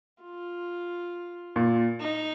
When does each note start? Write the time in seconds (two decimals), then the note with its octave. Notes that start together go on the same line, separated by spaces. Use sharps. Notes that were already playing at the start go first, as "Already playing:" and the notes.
0.23 F4
1.56 A#2
2.00 D#4